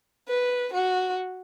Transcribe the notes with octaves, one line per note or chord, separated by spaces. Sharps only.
B4
F#4